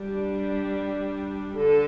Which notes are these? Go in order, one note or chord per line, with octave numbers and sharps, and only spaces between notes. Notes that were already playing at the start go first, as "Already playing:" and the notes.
Already playing: G3 D4
D3 A4